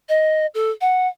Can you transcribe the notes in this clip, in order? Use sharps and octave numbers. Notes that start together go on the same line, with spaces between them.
D#5
A4
F#5